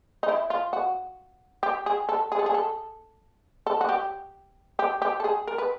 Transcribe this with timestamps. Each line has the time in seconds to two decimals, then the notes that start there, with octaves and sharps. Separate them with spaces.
0.23 D#4
0.28 E4
0.50 F4
0.73 F#4
1.63 G4
1.86 G#4
2.09 A4
2.32 G#4
2.39 A4
2.46 G#4
2.54 A4
3.67 A4
3.81 F#4
3.89 G4
4.79 G4
5.02 G4
5.20 A4
5.24 G#4
5.47 A#4
5.58 B4